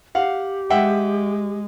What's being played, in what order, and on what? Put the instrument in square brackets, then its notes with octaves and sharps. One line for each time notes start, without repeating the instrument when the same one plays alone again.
[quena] G4 [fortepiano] F5 F#5
[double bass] G#3 [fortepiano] E5 F#5 G5